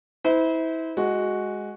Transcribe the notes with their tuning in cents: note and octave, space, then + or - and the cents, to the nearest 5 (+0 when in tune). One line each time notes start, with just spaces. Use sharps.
E4 -30 C5 -30
G#3 +0 F#4 +0